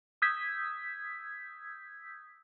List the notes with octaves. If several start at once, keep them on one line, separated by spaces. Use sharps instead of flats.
D#6 E6 G6 G#6 B6